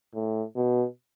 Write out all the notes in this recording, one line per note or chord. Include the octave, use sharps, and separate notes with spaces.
A2
B2